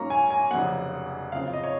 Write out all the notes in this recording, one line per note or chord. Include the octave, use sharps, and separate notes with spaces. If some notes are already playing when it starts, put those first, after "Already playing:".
Already playing: G#2 F#3 A#3 C#4 A#5 C#6
G#5
G#5
F1 F2 C#3 F#3 A#3 F#5
F#1 F#2 C#3 F3 C4 F5
F5
D#5
C#5